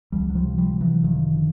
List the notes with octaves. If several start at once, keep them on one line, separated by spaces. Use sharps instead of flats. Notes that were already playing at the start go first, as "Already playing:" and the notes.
C#2 F3 G3
F#3
F3 G3
C3
F3 G3
C3
E3 F#3
F#1 D#3 F3
D3